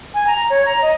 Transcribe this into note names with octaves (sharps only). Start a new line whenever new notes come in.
G#5
A#5
C#5
A#5
D#5